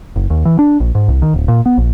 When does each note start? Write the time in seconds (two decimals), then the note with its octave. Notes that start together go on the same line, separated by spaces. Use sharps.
0.16 F#1
0.30 D#2
0.45 E3
0.59 D4
0.80 A#1
0.95 G#2
1.08 C2
1.22 D#3
1.34 D1
1.48 A#2
1.66 B3
1.78 A#1